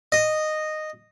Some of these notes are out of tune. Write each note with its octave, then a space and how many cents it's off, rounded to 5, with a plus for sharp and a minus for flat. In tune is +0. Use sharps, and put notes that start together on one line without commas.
D#5 -10